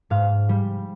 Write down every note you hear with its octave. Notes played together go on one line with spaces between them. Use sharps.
G#2 F5
G3